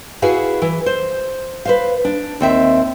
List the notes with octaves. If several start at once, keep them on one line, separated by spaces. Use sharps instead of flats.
E4 F#4 G#4 B4 F5
E3
C5
B4 C5 F5
D4
D#2 C4 E5